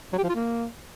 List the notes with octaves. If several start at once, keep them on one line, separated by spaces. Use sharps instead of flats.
F#3
G4
F3
F4
A#3